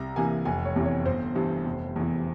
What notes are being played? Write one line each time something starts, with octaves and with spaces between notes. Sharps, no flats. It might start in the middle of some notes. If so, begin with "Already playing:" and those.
Already playing: C2 A#5
C3 E3 A#3 G#5
F1 G#5
C#5
E2 C3 E3
C#5
G1 C5
G2 E3
F1
E2 E3